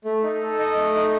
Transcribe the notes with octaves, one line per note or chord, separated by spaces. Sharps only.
A3
D#4
A4
D#5
A3
D#4